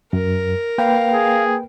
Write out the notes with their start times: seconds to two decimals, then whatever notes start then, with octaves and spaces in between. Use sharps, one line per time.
0.13 F#2 A#4
0.78 A#3 B4 F5 G5
1.14 G#4